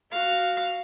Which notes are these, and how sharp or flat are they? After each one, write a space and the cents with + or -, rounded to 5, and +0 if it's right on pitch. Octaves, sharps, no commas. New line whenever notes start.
F#4 +0 F5 +0